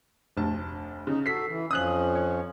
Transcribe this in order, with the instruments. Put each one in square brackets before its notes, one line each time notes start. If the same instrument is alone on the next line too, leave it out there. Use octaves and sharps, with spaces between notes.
[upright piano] F1 D2 A5
[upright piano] C#3 [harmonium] D#4
[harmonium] F#4 A4 [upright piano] B6 C7
[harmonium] E3
[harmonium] F2 F3 C#4 [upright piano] D#6 F#6 F#7
[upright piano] C#5